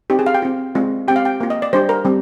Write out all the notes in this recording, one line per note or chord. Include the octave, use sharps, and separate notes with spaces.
C4 D#4 G4
G#4
F5
G5
C4 F4
G#3 C4 F4
C4 G4 G5
F5
G5
A#3 F4
D#5
D5
G3 D4 G4 C5
A#4
G3 C4